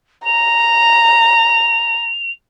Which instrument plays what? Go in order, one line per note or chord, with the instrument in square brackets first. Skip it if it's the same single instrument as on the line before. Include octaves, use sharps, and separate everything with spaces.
[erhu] A#5 [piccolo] F7